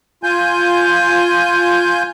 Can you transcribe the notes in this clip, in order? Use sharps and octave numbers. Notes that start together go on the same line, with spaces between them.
F4 G#5 G6